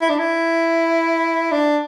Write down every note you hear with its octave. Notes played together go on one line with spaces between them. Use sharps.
E4
D4
E4
D4